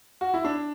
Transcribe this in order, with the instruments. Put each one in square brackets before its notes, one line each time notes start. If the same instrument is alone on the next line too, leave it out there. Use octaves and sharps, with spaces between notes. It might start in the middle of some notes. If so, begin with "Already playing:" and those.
[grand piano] F#4
E4
D4